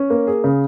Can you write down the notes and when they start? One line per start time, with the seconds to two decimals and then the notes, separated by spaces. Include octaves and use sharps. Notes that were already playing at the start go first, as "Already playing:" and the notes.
Already playing: C#4
0.10 A#3
0.27 G#4
0.44 C#3